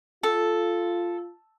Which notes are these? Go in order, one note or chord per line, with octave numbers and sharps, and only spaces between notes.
F4 A4